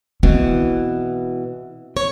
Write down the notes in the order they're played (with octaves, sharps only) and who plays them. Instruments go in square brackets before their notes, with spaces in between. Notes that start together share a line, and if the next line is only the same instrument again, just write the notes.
[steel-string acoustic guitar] B2 E3 [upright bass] C4
[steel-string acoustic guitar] C#5